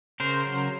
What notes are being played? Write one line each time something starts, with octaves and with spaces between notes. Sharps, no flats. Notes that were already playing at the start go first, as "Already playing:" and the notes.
C#3 A#4 C5
F#3